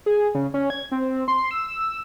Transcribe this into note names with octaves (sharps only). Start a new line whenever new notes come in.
G#4
C#3
C#4
G#6
C4
C6
E6